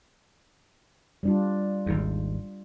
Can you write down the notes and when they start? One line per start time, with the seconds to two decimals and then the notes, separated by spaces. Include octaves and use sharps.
1.23 G3 D4 F4
1.86 G#1 D#2